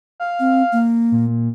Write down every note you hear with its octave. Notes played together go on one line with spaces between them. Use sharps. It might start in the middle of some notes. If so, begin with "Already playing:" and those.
F5
C4
A#3
A#2